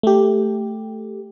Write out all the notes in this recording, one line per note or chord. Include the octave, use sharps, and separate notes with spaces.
A3 G4